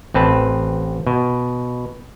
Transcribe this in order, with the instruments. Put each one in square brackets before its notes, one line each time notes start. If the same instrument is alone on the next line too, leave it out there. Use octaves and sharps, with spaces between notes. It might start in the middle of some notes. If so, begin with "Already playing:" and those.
[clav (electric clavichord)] A1 C4 B4 A5
B2